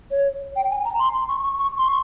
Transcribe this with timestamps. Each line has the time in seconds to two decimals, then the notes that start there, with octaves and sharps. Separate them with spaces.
0.11 C#5
0.56 G5
0.71 G#5
0.85 A#5
0.99 C6
1.29 C#6
1.44 C#6
1.58 C#6
1.78 C6
1.88 C#6